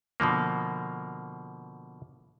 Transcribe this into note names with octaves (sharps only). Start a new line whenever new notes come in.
B2 D3 F3 A#3